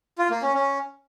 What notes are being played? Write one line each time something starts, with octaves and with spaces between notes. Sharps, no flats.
F4
A#3
C#4
C#4